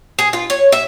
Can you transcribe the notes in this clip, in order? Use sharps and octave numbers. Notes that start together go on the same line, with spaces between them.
G#4
F4
C#5
E5